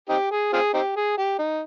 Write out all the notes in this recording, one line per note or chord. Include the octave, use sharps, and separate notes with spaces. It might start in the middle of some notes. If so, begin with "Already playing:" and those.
C4 D#4 G4
G#4
C4 F4 G#4
C4 D#4 G4
G#4
G4
D#4